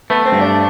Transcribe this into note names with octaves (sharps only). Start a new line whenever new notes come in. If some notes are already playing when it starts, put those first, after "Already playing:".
A3 B3
C4
G2
D4